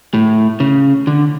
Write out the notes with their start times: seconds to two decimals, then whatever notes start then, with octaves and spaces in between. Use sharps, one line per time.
0.14 A2
0.60 C#3
1.07 D3